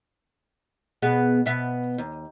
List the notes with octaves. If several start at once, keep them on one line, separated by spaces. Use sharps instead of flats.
B2 B3 G#4
B2 B3 E5
D#2